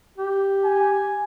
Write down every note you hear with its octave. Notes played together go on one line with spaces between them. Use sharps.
G4
G#5